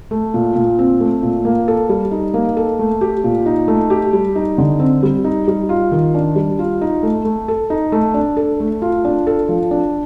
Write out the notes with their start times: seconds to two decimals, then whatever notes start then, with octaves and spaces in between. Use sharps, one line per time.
0.11 A3
0.34 A#2
0.56 A#2
0.79 C4
1.00 A3
1.23 A#2
1.45 A#3
1.68 A4
1.89 G3
2.11 D#4
2.34 A#3
2.57 A4
2.79 A3
3.01 G4
3.24 A#2
3.46 D#4
3.68 A3
3.90 G4
4.13 G3
4.36 D#4
4.58 D3
4.80 C4
5.03 G3
5.24 D#4
5.48 G3
5.69 F4
5.92 D#3
6.14 D4
6.36 G3
6.59 F4
6.81 D#4
7.03 A3
7.25 A3
7.48 A4
7.70 D#4
7.92 A3
8.14 D4
8.37 A4
8.60 A3
8.82 F4
9.05 D4
9.27 A4
9.49 F3
9.71 D4